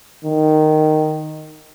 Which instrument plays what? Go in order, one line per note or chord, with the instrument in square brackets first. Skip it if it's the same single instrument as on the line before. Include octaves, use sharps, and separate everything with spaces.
[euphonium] D#3